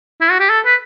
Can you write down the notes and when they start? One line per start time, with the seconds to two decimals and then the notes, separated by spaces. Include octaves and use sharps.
0.21 E4
0.31 F#4
0.40 G4
0.49 A4
0.65 B4